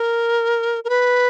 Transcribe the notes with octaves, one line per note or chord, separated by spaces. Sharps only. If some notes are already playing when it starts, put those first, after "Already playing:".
Already playing: A#4
A#4
B4